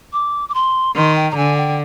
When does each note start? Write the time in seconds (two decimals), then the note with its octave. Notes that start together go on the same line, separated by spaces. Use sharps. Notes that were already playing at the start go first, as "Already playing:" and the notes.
0.13 D6
0.49 D6
0.54 C6
0.96 D#3 C6
1.16 G5
1.31 A#5
1.37 D3 G#5
1.57 G5